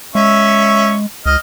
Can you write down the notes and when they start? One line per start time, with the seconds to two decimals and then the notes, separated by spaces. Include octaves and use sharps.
0.15 G#3 C#4 E5 C#6
1.26 C#2 D#5 F6